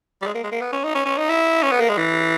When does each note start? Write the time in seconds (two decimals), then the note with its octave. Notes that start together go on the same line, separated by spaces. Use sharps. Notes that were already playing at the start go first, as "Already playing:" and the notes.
0.22 G3
0.26 G#3
0.34 A#3
0.44 G#3
0.52 A#3
0.61 B3
0.72 C#4
0.84 D#4
0.95 C#4
1.06 C#4
1.18 D#4
1.29 E4
1.63 C#4
1.71 B3
1.80 A#3
1.89 G#3
1.98 E3